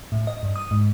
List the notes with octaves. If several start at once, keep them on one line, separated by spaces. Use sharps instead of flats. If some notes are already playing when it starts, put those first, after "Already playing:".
A2
D#5
G2
D#6
G#2